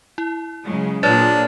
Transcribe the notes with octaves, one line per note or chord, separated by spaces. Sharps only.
E4
C#3 F#3 G#3
A#2 D4 G#4 B4 C#5 D5 F6 A6